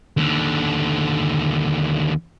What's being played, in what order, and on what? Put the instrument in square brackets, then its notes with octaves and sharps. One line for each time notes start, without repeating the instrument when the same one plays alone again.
[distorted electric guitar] D#2 D3